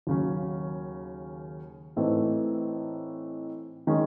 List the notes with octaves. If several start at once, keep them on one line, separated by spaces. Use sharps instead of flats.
D#2 C#3 F#3 C#4
A2 E3 A3 C4 D#4
D#3 G#3 C#4